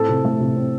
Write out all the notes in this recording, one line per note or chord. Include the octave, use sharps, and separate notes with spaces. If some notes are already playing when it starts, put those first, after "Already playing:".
Already playing: A2 C4 A4
C3
A3
C3
C4